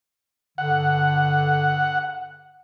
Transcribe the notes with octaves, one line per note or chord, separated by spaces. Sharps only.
G2 D3 F#5